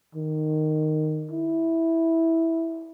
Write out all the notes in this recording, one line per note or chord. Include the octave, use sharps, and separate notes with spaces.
D#3
E4